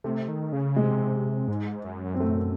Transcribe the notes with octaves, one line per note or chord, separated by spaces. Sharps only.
C3 A3
D#3
C#3
C3 G#3
G#2
F#2
C4
A3